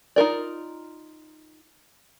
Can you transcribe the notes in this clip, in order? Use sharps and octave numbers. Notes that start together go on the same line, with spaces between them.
D#4 F4 A#4 D5